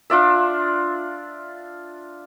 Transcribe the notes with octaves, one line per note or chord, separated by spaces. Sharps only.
D4 F4 D5 E5